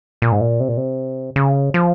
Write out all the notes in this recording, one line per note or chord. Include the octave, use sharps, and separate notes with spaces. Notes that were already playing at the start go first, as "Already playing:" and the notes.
A#2
G#2
A#2
C3
A#2
C3
C#3
F3